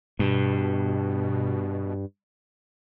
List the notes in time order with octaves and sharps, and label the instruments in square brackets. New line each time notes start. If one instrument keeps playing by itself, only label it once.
[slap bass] G2 [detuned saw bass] B2